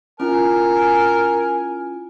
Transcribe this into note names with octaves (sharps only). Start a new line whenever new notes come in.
C#4 E4 F4 A#4 G#5